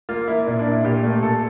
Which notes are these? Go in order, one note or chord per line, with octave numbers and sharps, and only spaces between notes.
A#3 F4
A#3 E4
A#2 E4
D4
A#2
E4
A#2 G4
A3
A#2 A4